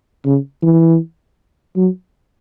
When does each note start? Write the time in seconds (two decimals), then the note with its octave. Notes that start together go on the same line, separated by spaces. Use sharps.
0.26 C#3
0.63 E3
1.76 F#3